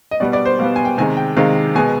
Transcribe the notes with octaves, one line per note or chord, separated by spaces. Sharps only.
D#5
B2 G3 B3 D5
D5
C5
B2 G3 B3 F5
G#5
G5
C3 D#3 G#3 G#5
G5
C3 D#3 G#3 F5
B2 G#3 B3 G#5